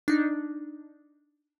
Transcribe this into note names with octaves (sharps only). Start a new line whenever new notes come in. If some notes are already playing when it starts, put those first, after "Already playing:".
D4 D#4